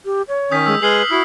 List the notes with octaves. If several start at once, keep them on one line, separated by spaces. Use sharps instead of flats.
G4
C#5
D#3 C#4 D#6 G6 B6
G#3 E6
G#3 G#4 B4 F6 C7 F#7
E4 F#4 D#6 C7